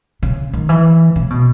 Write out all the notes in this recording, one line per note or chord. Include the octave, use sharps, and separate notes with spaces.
C#3
D#3
E3
C#3
B2